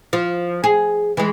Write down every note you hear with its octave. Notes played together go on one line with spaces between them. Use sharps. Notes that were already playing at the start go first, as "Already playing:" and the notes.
F3
G#4
E3 G#3